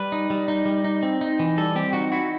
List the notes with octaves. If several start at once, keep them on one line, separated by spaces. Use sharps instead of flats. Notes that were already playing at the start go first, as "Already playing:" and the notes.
Already playing: G3 B4
D#4
G3
D#4
G3
D#4
C4
D#4
E3
G3 A4
C4 G4
D#4 F#4
E4 F#4